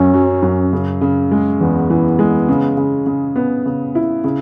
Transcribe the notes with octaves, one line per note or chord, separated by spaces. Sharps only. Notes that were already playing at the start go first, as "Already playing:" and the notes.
Already playing: F#2 F#3 C#4
F#3
F#2
C#3
C#3
G#3
E2 B3
E3
G#3
C#3
C#3
C#3
B3
C#3
E4
C#3